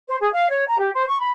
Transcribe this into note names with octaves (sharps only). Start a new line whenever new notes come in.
C5
G#4
F5
C#5
A#5
G4
C5
C#6
B5